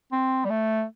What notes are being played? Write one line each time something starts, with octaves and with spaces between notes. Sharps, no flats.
C4
G3
A3